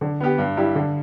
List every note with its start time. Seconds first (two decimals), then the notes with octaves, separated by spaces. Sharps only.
0.01 D3
0.20 B3 G4
0.38 G2
0.57 G3 E4 G4
0.75 D3